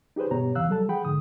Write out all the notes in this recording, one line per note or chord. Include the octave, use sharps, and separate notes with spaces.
D#4 G4 G#4 B4 C5
G2 B2 B3 G4 C#5 A#5
D#2 C3 E3 F5 E6 F#6
F#3 G3 A4 A5
F3 G#4 F#5 G5 B5
G#2 D3 D#6